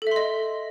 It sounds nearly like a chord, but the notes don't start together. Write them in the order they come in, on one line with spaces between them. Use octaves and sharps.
A4 E5 C6 D#5